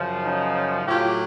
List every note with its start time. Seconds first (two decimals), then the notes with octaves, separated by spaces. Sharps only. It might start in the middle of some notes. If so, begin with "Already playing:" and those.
Already playing: F#2 C#3 F3
0.23 C#4 D#4
0.86 A2 F#3 F4 G4